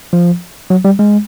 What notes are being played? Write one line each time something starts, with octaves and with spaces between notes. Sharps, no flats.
F3
F#3
G3
G#3